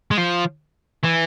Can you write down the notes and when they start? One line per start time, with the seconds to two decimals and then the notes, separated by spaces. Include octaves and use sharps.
0.11 G#3
0.18 F3
1.03 E3